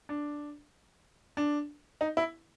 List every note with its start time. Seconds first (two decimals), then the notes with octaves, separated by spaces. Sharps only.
0.09 D4
1.37 D4
2.01 D#4
2.17 E4